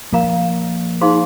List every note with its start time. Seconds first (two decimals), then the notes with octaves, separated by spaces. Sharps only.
0.12 F3 A#3 A#4 F5 A#5
1.01 D#4 G#4 C5 F5 C6